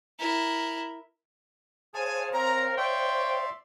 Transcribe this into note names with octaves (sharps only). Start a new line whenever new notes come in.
E4 A#4
G#4 C5 C#5 F5 G#5 A5
C4 A#4 A#5
D5 E5 G5 C6 C#6